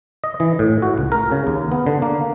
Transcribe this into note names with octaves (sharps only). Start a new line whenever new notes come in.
D#5
E3
A2
F#4
C#2
A#4
C#3
D#2
B3
D3
A#3